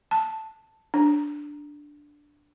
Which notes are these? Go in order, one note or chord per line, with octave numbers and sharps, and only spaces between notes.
A5
D4